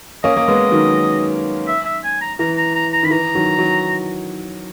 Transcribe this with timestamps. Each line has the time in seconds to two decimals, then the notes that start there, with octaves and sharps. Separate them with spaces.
0.24 A#3 C#4 D#5
0.37 A#3
0.48 G#3 B3
0.72 D#3 F#3
1.67 E5
1.85 E5
2.04 G#5
2.21 A#5
2.39 E3 A#5
2.57 A#5
2.75 A#5
2.92 A#5
3.03 D#3 B5
3.11 E3 A#5
3.35 D#3 F#3
3.59 D#3 F#3